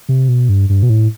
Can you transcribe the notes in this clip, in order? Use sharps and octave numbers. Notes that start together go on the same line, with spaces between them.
C3
B2
G2
G2
B2
A2